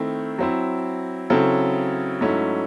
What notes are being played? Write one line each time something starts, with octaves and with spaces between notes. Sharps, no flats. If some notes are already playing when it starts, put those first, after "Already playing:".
Already playing: D#3 A3 C4 E4
F#3 C4 E4
C#3 F#3 C4 E4 A4
G#2 F#3 A3 C#4 E4